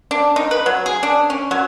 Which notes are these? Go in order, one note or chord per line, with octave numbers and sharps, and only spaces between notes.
D4
D#4
B4
F#3
G#4
D4
C#4
F#3